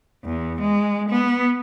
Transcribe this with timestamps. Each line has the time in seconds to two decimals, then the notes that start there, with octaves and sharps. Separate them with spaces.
0.25 E2
0.61 G#3
1.09 B3